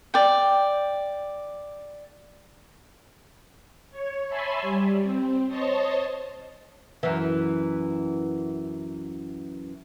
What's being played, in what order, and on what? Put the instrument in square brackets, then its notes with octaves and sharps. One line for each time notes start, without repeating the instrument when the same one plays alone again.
[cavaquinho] D5 G5
[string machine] C#5
C#5 E5 G#5 A5 B5 C6
G3
C4
C5 C#5 D#5 A5
[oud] F#2 E3